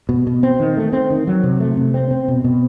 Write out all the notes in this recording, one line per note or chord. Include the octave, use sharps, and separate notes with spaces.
B2
B2
C4
D#3
A3
C4
D#3
F#3
C3
A3
C3
C4
C4
B2
B2